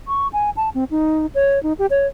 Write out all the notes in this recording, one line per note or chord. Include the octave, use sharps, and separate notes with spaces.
C#6
G#5
A5
C4
D#4
C#5
D#4
G4
C#5